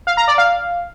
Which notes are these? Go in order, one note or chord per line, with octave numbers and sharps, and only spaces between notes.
F5
A#5
D5
F5